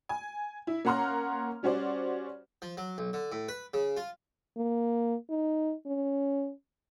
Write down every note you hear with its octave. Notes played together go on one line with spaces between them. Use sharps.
G#5
E4
A#3 C#4 F#5 A#5 C6 F6
G3 C#4 F#4 C5 D5
F3
F#3
B1
D3
A2
B4
C#3
F4
A#3
D#4
C#4